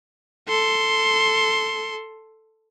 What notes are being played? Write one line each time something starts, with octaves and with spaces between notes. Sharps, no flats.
A4 C6